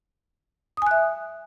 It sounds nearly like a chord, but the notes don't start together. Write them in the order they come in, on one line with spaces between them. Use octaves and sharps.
D#6 G#5 F#6 E5